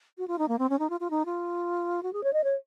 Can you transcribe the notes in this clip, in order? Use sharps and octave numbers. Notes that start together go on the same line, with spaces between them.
F#4
F4
D#4
A#3
C4
C#4
D#4
F4
F4
D#4
F4
F#4
G#4
C#5
D#5
C#5